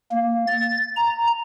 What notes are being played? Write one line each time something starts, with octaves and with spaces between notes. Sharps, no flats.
A#3
A6
A#5